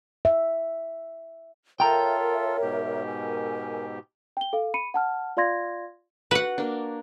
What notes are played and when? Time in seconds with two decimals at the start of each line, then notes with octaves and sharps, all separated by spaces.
0.25 E5
1.80 F4 A4 A#4 C#5 E5 G5 A#5
2.62 G#2 B2 G4
3.05 A#4 G#5
4.37 G5 G7
4.53 A4 F5
4.74 B5 C#7 D#7
4.94 F#5 A5 F6
5.37 F4 D5 F5 C6 G#6 A#6
6.31 F#4 B4 F#5
6.58 A#3 D4